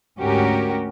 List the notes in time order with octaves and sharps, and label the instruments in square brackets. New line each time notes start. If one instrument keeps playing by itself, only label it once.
[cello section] D2 G#2 C#4 F#4 G4 A#4